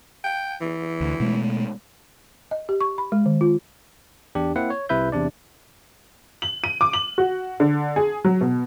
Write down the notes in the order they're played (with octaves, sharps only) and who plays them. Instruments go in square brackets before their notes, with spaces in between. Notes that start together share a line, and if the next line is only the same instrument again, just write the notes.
[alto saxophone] G5
E3
[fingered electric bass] D2
B2 G#3 A3
[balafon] D#5
G4
C#6
B5
G#3
D#3
F4
[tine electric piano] E2 D4 G4
A#3 C4 E4 F#5
C#5
C2 C3 E4 B4 E5 G6
E2 C3 D4 D5
[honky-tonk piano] F#7
D#7
D6
F#7
F#4
D3
G#4
F#3
B2